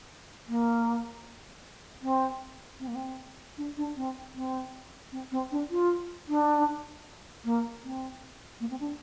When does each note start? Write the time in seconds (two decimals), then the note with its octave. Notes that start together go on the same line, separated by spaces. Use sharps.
0.48 A#3
2.02 C4
2.80 C4
2.87 A#3
2.95 C4
3.57 D4
3.77 D4
3.96 C4
4.35 C4
5.12 C4
5.31 C4
5.51 D4
5.70 F4
6.28 D4
7.44 A#3
7.84 C4
8.60 A#3
8.70 C4
8.80 D4